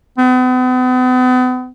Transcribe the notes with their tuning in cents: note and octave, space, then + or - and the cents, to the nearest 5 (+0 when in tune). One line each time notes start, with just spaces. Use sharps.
B3 +40